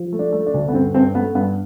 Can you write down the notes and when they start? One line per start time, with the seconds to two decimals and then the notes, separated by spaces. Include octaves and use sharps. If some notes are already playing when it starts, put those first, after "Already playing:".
Already playing: F3
0.12 A3
0.19 D4
0.32 A3
0.47 D4
0.54 D2
0.68 B3
0.73 G2 C4
0.94 G2 C4
1.15 A3 B3
1.35 G2 B3